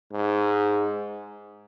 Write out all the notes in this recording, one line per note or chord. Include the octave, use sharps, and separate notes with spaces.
G#2